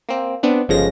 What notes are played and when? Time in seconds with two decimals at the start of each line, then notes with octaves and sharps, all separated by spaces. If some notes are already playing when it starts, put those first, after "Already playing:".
0.09 A#3 C4
0.43 B3 C4 D4
0.69 G1 C#3 F3 G#3 A#6